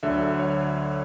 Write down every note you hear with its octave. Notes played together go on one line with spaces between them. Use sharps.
D2 D3 F#3 E5
C#5